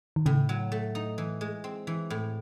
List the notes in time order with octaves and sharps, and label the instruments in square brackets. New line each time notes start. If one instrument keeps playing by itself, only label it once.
[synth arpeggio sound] D#3
[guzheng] A2 [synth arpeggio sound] C#3
[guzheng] F#3
A3
D#4
E3
G#3
C4
E3
A2